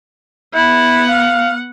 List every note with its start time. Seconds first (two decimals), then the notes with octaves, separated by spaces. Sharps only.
0.54 B3 E4 F#5
1.08 F5